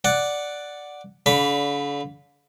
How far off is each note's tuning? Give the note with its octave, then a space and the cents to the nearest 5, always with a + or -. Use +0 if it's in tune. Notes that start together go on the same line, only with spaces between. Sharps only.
D5 +0 F#5 +0
D3 -45 D5 -35 B5 +0